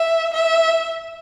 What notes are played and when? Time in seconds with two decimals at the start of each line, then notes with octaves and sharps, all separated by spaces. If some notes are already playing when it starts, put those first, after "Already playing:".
Already playing: E5
0.34 E5